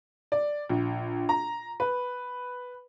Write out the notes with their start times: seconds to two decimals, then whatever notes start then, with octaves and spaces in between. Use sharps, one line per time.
0.32 D5
0.70 A#1
1.29 A#5
1.80 B4